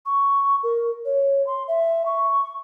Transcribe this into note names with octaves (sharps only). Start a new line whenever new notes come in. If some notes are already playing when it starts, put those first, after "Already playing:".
C#6
A#4
C#5
C6
E5
C#6